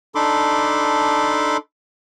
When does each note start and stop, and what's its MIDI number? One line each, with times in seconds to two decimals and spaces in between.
0.15 1.57 62
0.15 1.57 63
0.15 1.57 69
0.15 1.57 83
0.15 1.57 84
0.15 1.57 86